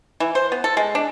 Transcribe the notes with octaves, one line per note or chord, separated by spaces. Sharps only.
E3
C5
B3
A4
G#3
D4